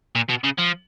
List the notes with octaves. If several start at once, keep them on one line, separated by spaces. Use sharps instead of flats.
A#2
B2
C#3
F3